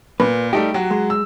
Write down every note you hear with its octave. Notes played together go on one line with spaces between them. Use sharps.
A#2 B4
G3 A3 D#4 G4
F#3 F#4
G#3
E6